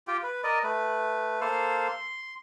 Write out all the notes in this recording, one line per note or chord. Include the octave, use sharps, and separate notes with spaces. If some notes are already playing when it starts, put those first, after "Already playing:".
F4 G4 G5
B4
A#4 D5 D#5
A3 B4
A#3 A4 C5 F5
C6